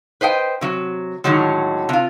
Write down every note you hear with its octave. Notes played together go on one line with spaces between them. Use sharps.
B4 C5 D#5 F#5 G5
C3 F#3
A2 D3 D#3 F#3 G#3
C3 F4